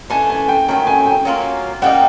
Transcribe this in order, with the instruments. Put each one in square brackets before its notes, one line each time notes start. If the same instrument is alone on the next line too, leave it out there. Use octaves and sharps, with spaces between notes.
[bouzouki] E3 A3 D4 [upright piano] G#5
[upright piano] G#5
G5
[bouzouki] D#3 F#3 A3 [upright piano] G5
[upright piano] G#5
G5
[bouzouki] F#3 A#3 C#4 F4
[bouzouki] G3 A#3 D#4 [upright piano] F#5